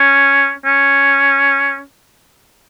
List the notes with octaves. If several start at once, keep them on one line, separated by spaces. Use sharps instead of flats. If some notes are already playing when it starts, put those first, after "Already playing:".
Already playing: C#4
C#4